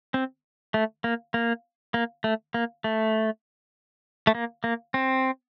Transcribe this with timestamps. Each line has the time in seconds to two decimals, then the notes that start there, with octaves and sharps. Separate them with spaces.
0.14 C4
0.74 A3
1.04 A#3
1.34 A#3
1.94 A#3
2.24 A3
2.54 A#3
2.84 A3
4.27 A3
4.35 A#3
4.64 A#3
4.94 C4